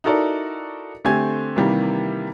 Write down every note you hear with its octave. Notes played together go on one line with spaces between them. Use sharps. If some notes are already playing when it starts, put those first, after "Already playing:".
D#4 E4 F#4 A4 A#4 D5
D3 A3 C4 G4 G#5 G#6
C3 D#3 E3 G3 A#3 G4